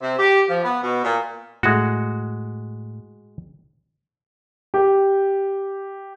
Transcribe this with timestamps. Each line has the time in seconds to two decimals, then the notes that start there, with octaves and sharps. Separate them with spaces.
0.01 C3
0.18 G4
0.49 F3
0.64 B3
0.83 B2
1.03 A#2
1.63 A2 G#3 F#4
4.74 G4